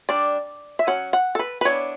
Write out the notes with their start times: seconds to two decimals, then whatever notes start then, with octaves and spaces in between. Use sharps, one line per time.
0.09 G3 D4 D5
0.79 E5
0.87 F#3 C#4 F#5
1.13 F#5
1.35 A4
1.39 B4
1.61 B4
1.65 E3 B3 D4 C#5